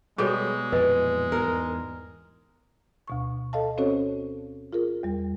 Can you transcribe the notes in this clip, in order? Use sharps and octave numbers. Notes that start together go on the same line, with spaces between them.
B2 G3 G#3 G#4 A4 C#5
F2 A#2 E3 B4 D#5 G#5
E2 G#2 A#4
D2 B2 C#6
A4 D#5 F5 A5
C4 C#4 F#4 A4 C5 C#5
F4 G#4 A#4
E2 G3